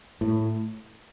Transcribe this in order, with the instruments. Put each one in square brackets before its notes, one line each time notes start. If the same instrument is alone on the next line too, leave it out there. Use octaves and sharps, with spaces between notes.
[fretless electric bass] A2